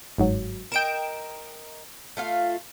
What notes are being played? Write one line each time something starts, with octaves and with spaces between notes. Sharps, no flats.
G1 G#2 F#3
A#4 D#5 G5 D7 E7
A3 F4 F5